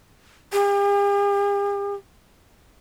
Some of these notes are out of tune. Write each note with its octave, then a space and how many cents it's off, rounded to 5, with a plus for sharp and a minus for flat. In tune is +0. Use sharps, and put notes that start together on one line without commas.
G4 +45